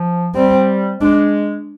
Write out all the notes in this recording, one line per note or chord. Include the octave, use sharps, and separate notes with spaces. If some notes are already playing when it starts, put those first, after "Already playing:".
Already playing: F3
G3 C4
G#3 D4